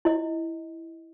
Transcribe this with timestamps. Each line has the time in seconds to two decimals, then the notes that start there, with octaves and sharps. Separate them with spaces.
0.05 E4 D#5